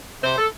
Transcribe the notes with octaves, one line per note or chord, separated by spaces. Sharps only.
C3 C5
A4